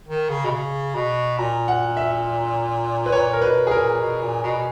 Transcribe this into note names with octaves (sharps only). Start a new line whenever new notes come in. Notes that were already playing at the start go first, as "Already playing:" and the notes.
D#3
C#3
B2
C#3
B2
A#2 A#5
F#5
E5
B4
A#2 C#5
A#4
B2 B4
G#4
A#2 A#4
B2
A#2
B2